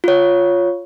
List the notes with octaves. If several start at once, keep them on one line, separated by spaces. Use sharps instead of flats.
F4 C#5